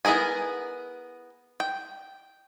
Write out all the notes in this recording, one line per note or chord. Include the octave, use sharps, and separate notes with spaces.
B3 E4 G#4 A#4 G#5
G5